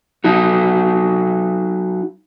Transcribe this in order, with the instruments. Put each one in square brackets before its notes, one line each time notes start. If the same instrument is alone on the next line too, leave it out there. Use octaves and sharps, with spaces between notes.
[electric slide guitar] F#3 D#4 F#4